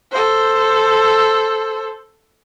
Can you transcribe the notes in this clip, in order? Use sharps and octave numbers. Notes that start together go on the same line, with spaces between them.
A4 C5